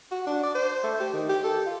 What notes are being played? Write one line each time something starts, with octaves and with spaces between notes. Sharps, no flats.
F#4
D4
D5
C5
A3
G4
D#3
G4
A4
F4